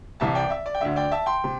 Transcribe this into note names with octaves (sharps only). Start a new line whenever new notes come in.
C2 C3 E3 E5 A5
D5 G5
E5
D5
G5
D2 D3 E5
D5 G5
E5 A5
G5 C6
C3